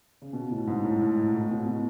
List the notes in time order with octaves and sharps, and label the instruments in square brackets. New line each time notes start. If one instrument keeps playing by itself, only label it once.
[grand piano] C#3
B2
A2
G#2
A2
A2
A2
A2
B2
B2